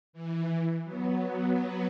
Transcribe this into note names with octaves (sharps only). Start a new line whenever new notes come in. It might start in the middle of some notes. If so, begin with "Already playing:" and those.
E3
F#3 B3